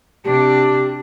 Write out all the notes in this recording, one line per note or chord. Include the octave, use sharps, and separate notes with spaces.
C3 D4 G4